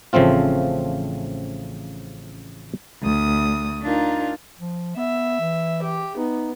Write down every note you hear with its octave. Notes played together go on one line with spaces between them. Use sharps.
A1 C#3 F3 A3 C4 F4
D2 D#6
D4 D#4 F4 A#4
F3
B3 E5
E3
G4
B3 D#4